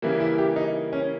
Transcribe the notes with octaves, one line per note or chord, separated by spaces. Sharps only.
C#3 E3 G3 A#3
E4
G4
D#4
C#4